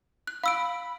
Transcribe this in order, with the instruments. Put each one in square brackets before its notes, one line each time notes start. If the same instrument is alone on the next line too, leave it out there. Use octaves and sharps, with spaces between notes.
[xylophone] F#6
[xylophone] F5 E6 D7 [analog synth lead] B5